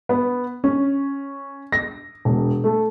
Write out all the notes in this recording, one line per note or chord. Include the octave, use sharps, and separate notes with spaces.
B3
C#4
A#6
E1
A3